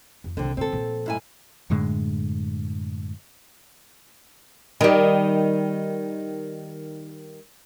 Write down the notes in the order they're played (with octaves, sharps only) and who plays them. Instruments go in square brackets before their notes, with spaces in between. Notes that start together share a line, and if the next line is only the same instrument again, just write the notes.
[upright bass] F2
[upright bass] C2 E3 [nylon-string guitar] D3 C4
[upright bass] A#2 D3 [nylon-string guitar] C4 A4
[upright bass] A#2 F3
[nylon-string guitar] G#2 E4 G#5
[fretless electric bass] F#2 A2 D3 G#3
[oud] D#3 G3